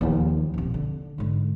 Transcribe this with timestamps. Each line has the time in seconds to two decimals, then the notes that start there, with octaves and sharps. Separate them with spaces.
0.01 D#2 F3
0.54 D#1 C3
0.74 D3
1.18 G#2 D3